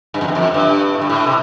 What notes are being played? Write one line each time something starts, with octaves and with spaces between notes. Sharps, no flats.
G2
F2
E2
F2
G2
A2
G2
A2
C3